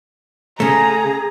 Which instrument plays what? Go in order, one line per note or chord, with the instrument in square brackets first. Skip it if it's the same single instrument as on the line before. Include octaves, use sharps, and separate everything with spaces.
[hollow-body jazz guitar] C#3 A3 [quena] G#4 [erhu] A#5